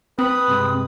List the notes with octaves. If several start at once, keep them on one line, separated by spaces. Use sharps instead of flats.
C4 B4 D#6
G2 C3 G#3